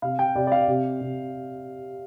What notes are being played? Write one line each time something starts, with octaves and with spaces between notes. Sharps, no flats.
C3 F5
G5
C3 D5
D5
F5
C3
C3